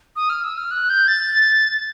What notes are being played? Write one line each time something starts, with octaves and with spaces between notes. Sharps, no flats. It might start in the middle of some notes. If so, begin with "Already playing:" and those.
D#6
F6
E6
F6
F#6
G6
A6